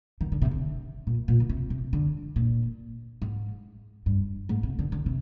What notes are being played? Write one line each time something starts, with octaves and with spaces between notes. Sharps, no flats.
D#3
D3
C3
D3
A#2
A#2
D3
C3
C3
D3
A#2
G#2
G2
G#2
C3
D3
D3
C3